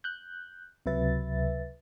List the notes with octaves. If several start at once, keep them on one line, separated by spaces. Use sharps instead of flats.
F#6 G6
C#2 C3 F#3 B4 E5 A6